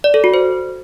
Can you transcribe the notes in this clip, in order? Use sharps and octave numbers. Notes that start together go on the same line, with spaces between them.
D5
A4
F#4
C5